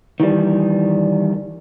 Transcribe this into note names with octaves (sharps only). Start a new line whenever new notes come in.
D#3 E3 G3